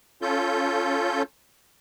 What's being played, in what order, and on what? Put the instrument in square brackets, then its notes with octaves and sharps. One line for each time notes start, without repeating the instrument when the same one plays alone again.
[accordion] C#4 F4 A4 G6